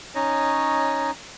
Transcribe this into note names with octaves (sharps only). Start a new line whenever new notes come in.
C#4 D#4 C#5 D#5